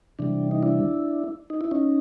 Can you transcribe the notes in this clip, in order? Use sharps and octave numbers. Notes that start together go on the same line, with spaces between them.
C3 E3 G3 D4
D#4
D4 E4
D#4
E4
C#4 D#4